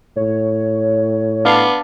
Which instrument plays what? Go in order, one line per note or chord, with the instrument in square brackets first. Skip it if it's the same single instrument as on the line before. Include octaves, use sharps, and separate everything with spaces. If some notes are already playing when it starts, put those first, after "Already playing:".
[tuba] A2 [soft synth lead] C#5
[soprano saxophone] B3 [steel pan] D4 F5 [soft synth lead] D6